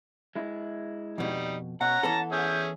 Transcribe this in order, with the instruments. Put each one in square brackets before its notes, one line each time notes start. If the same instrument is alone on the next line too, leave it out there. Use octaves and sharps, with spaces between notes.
[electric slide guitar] G#3 E4
[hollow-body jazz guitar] F2 B2 [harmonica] G3 D#4
[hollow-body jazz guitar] B2 [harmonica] C#4 A#5 [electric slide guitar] F#5 [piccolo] F#6
[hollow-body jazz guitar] E3 B3 A4 [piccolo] A5
[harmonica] C#4 G#4 E5 [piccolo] G6